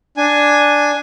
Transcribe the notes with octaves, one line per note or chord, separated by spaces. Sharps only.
D4 G#5